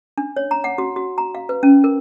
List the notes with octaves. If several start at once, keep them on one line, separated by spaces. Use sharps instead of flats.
D4
C#5
A#5
F#5
F#4
F#4
A#5
F5
B4
C#4
A#4